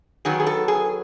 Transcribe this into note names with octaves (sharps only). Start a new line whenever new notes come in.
D#3 F#3 B3 G#4
G#4
A4
G#4